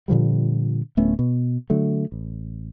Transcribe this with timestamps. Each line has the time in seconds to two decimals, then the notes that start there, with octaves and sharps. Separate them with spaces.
0.08 A#2 D3 F3 G3
0.97 D1 A3 B3 C#4
1.19 B2
1.70 D3 F#3 A3
2.12 A1